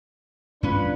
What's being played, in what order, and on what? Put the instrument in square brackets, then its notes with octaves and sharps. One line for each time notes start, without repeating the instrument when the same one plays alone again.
[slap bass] G2 C#4 [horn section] D4 F4 B4